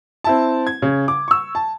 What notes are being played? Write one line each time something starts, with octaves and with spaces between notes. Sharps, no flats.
C4 E4 A5
G#6
C#3
D6
C#6 E6
A5